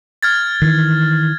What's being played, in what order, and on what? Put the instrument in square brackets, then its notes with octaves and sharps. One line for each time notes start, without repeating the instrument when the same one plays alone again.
[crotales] F6 G#6 A6
[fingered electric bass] D#3 E3